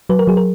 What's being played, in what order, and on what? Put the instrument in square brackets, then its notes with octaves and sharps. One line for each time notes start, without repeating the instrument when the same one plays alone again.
[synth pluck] F#3 B4
A#4
F#3 G#4
A#4